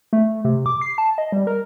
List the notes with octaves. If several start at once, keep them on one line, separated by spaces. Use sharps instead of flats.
A3
C3
D6
C7
A5
D#5
G3
A#4